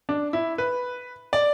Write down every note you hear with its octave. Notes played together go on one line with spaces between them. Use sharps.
D4
E4
B4
D5